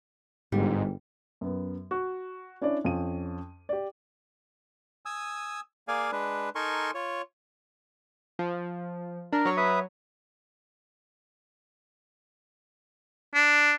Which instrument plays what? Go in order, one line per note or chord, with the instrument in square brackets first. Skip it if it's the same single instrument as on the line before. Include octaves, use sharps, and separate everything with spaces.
[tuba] G1 [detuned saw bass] G#2 [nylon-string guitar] G3
[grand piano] F#2 B3
F#4
C#4 D4 E4 C#5 D5
F2 C#4 F4 D#7
G4 D5
[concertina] G#5 D#6 E6
A#3 G#4 D5 F5 G#5
G#3 D4 B4
D#4 A4 A#4 G#5 C6 C#6
F4 C#5
[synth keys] F3
[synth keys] D4 [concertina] A#4
[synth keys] F#3 C#5
[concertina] B4 E5 D#6
[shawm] D4